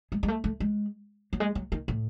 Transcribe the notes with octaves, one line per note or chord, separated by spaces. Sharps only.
G#3
G#3
A3
A3
G#3
F#3
G#3
F#3
D#3
A2